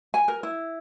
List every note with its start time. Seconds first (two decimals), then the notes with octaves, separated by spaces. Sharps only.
0.14 G#5
0.28 A#4
0.43 E4